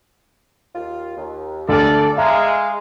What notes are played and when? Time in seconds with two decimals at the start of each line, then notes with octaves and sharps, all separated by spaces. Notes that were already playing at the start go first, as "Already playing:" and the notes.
0.74 D#2 F4
1.17 D#2
1.69 D2 A4 D5 F6
2.17 G#3 E5 F5 A#5 D6